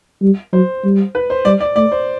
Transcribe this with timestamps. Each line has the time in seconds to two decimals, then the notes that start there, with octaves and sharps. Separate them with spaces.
0.22 G3
0.53 F#3 C5
0.84 G3
1.15 B4
1.30 C5
1.45 G3 D5
1.60 D5
1.76 A3 D5
1.92 C5